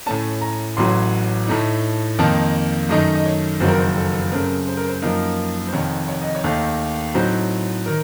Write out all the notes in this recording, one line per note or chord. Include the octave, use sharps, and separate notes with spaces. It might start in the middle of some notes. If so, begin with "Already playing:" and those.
A2 A3 C#4 A5
A#5
A1 A2 F#3 C6
A2 A3 D#4
F2 D#3 A#3 D#4 A5
F#2 D#3 A3 D#4 D#5
D#5
C#5
F#1 F2 D#3 F#3 C4 C5
A#4
C5
A4
F#2 C#3 A3 C4 A#4
C5
A#4
C5
F#2 F3 A#3 D#4 A#4
C5
F1 F2 D#3 C#5
C#5
D#5
C#5
D#2 D#3 A3 D#4
A2 F#3 C4 D#4 C5
D#3 A#4